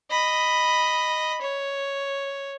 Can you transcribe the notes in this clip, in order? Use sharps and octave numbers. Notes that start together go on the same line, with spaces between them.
D#5 B5
C#5